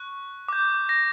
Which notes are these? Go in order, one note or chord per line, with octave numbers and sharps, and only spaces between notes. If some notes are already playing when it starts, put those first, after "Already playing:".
Already playing: C#6 F#6
D6 G6
A#6